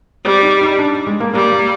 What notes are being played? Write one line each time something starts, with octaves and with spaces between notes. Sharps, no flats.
G3 C4
D#4
D#4
D4
G#3
A#3
G3 A#3
A#3